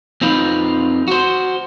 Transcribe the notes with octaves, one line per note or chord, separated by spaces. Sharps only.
F2 C4 D#4 F4 B4
F#4 C5